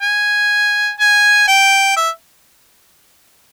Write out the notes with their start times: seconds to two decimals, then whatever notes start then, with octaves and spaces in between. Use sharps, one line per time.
0.02 G#5
1.00 G#5
1.48 G5
1.97 E5